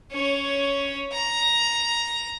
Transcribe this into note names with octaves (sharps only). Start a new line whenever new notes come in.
C#4 C#5
A#5